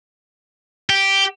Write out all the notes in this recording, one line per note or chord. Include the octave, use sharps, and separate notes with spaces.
G4